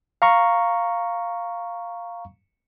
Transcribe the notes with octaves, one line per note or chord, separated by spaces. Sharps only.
F5 A#5 C#6